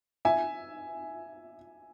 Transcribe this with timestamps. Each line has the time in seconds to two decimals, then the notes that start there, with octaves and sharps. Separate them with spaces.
0.25 E5 G#5